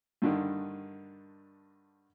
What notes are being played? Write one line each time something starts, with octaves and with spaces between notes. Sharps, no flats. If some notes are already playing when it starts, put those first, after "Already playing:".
G2 D3 D#3